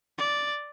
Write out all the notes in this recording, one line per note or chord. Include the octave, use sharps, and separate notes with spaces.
D5